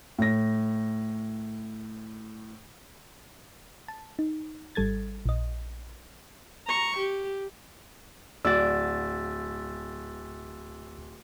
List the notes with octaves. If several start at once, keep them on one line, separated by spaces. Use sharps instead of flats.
A2 A#6
A5
D#4
G#1 G3 A4 G#6 A6
A#1 D#5
A#5 C#6
G4
D1 F#4 D5 E6 A6